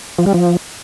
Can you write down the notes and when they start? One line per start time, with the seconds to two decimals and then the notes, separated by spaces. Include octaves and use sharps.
0.19 F3
0.26 G3
0.34 F3